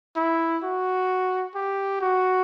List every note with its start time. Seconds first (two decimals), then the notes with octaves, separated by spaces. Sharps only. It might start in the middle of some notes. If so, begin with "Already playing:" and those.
0.16 E4
0.63 F#4
1.55 G4
2.01 F#4